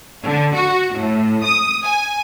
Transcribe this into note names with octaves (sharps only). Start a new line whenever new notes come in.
D3
F#4
A2
D#6
G#5